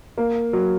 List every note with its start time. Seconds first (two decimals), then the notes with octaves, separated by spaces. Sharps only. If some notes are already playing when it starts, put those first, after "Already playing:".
0.18 A#3
0.53 F#3